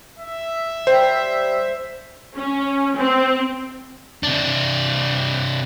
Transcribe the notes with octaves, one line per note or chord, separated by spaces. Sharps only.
E5
G3 C5
C#4
C4
C3 D4